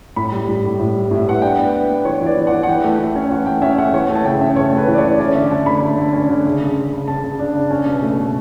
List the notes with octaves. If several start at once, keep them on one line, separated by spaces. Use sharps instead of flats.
A2 B5
G3
A2
A2
A2
G3
A2 E5
B3 F#5
D4 G5
B3
B3
B3
E3 C#5
E3 D5
E3
E3 F#5
F#5
E3 G5
A3
E3
C#4
E3 F#5
A3 G5
C#4 E5
A3 F#5
E3 C#5
A3
A5
C#3 G5
C#4 E5
C#3 C#5
A3
B4
E3
D5
C#3 C#5
C#4 D5
D3 E5
D3 A5
A3 B5
A3
D3
C#4
D3
C#3
C#3
C#3
C#3
C#3 A5
C#3
D4
C#3
C#4
B2
A3
B2